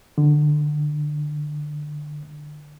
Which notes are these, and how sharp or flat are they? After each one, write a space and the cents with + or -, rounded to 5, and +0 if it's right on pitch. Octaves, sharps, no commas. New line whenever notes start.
D3 +20